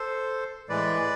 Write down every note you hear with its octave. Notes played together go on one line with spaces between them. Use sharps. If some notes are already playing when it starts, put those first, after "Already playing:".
Already playing: A4 C5
A2 E3 G#3 B4 D5